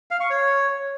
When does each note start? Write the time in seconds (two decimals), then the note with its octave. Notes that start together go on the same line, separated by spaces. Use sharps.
0.11 F5
0.20 C#6
0.30 C#5